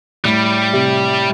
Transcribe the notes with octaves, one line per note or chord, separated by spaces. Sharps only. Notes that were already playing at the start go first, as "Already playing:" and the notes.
A2 G3
C3